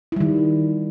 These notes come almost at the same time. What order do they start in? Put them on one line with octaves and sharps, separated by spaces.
E4 G3 D#3